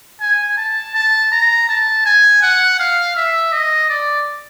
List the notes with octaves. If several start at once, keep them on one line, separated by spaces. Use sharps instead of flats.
G#5
A5
A5
A#5
A5
G#5
F#5
F5
E5
D#5
D5